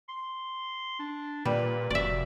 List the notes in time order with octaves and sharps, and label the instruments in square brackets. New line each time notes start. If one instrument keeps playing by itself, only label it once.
[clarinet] C6
D4
[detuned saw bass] A#2 [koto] G3 [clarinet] B4
[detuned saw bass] F1 [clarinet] F#4 [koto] D5 E5